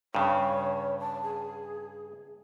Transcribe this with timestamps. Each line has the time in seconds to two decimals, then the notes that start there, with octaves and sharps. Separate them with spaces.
0.15 G2 C#3 C#5
1.00 A5
1.23 G#4